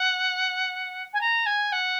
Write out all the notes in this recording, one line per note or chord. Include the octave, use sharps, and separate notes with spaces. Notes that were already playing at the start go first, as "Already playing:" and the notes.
Already playing: F#5
G#5
A#5
G#5
F#5